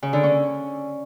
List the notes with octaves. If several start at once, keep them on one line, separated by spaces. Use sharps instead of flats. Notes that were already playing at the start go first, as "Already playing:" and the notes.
C#3
D3
C#4